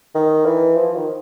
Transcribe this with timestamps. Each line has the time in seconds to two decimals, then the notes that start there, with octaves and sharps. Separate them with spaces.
0.15 D#3
0.45 E3
0.76 F3
0.95 D#3